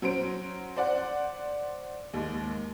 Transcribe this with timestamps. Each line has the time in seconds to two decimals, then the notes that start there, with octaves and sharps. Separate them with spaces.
0.02 F#3 C#4 C5 D7
0.77 C5 D5 F#5
2.14 D#2 G#2